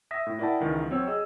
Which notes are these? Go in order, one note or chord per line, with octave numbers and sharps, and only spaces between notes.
E5 D#6 A#6 B6
A2
E4 A#4 D5 F#5 G5 A5
C#2 D#3 E3
F#3 C4 C#5 E6
G#4 D#5 E6